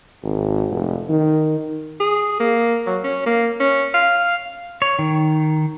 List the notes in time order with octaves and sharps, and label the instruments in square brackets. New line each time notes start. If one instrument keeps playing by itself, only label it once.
[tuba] G#1
F1
D#3
[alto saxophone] G#4
A#3
F#3
C#4
A#3
C#4
F5
[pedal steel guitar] C#5
D#3